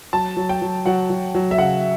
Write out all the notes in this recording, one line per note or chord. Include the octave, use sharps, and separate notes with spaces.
F#3 A5
F#3
G5
F#3
F#3 F#5
F#3
F#3
E5
C#3 F#5